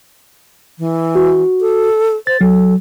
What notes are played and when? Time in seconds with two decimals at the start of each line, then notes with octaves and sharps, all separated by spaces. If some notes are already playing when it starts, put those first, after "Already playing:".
0.79 E3
1.15 F#4
1.61 A4
2.27 C5 A6
2.41 F#3 A4